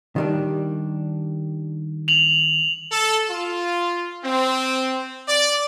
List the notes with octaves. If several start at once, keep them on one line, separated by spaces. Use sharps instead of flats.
D#3 G3 D4
F7 F#7
A4
F4
C4
D5